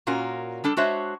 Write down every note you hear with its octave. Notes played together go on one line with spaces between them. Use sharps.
A#2 C#4 F4 F#4 A#4
G3 D4 A4
G#3 D4 F#4 C5 C#5 E5